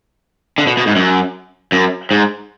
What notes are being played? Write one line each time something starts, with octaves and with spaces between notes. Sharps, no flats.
D3
B2
B2
G#2
F#2
F#2
G#2